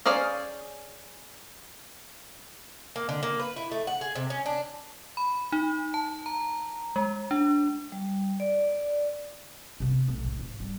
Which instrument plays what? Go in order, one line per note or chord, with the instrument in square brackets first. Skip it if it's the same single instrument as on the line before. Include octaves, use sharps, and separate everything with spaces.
[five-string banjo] C#4 G#4 C5 D5 F5
[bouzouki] A#3
D3
A#3
B4
E4
A3
F#5
G#4
C3
C#4
D4
[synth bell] B5
D#4
A5
A#5
G#3
D4
[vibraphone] G3
D5
[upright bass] C3 B3
B1 A2
A1
G#2
G3